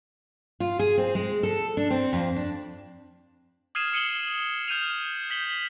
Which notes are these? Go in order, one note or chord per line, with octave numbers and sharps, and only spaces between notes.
F4
G#4
C4
G#3
A4
D4
C4
F2
D4
D#6 F6 G#6 C7 D#7 E7
D#6 C7 C#7 D#7 F#7 G7
F6 G6 D#7 F7
G6 B6 F#7 G7